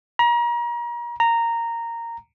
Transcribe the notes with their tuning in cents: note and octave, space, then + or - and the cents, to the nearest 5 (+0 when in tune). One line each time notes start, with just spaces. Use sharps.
A#5 +35
A#5 -10